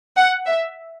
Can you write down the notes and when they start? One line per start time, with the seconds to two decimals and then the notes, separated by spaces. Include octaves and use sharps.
0.16 F#5
0.46 E5